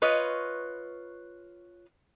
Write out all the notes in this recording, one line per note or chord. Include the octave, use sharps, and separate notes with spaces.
F4 B4 C#5 D#5